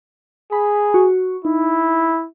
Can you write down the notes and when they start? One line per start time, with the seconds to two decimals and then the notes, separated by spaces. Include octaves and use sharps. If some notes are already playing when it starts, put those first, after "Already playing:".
0.52 G#4 B5
0.94 F#4 C#6
1.45 D#4 E4